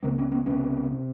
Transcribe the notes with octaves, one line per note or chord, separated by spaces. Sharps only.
C#2 C#3 A#3 C4
B3 C#4
B3 C#4
C#2 C3 B3 C#4
C3